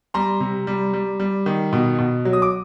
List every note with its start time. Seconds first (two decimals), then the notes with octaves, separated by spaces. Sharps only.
0.14 G3 A#5 C6
0.40 C3
0.67 G3
0.93 G3
1.20 G3
1.46 D#3
1.73 B2
1.99 B2
2.25 F#3
2.33 D#6
2.42 D6